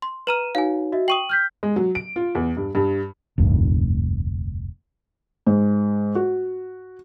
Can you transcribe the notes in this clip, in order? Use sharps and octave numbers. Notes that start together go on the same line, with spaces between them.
C6
B4 A#5 F6 D#7 E7
D#4 F#4 C#5 F5 G#5
F#4 D#5 E5
G5 C#6 D#6 D#7 F#7
F6 G6 B6
G#3
F#3
D7
F4
E2
G2
G2
F1 D2 G2 A#2
G#2
F#4